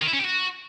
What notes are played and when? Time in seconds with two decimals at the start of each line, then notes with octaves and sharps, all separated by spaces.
0.02 D#3
0.07 E4
0.13 C#4
0.19 G4
0.25 F#4